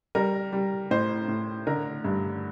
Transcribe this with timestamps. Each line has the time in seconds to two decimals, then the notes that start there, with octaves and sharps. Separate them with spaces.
0.15 G3 A#4
0.52 G3
0.91 A2 C5
1.28 A2
1.67 D3 A#4
2.05 G2